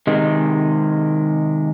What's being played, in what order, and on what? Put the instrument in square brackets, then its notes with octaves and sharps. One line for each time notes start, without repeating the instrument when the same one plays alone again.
[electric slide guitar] C3 D#3 G#3